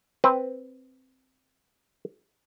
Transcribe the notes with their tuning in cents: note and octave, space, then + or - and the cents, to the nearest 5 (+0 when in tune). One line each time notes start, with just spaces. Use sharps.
C4 +0 B4 +0